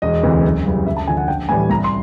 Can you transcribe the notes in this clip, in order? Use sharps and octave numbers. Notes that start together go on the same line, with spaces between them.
E1 D#5
D2 C3 E3
F#1
F#2 C#3 E3 G3
D2 E5
A5
D3 F3 G#5
F#5
A#1 G5
A2 E3 G3 G#5
C2 A#5
C6